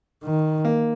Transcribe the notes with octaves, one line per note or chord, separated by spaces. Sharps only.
D#3
A#3